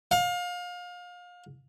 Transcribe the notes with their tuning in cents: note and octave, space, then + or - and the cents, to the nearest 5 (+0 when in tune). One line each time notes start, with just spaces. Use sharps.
F5 +30